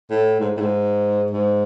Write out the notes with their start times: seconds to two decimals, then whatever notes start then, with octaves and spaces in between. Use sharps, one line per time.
0.10 A2
0.40 G#2
0.57 A2
0.61 G#2
1.31 G#2